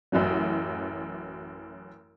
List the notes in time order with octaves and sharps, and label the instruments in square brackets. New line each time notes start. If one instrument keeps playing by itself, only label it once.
[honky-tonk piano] A1 F#2 E3 F#3